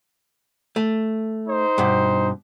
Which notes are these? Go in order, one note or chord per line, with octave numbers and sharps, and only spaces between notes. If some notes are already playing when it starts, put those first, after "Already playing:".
A3
D#4 C5
G2 B2